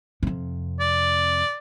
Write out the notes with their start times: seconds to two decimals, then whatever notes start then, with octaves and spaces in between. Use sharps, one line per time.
0.23 F2 C3
0.80 D5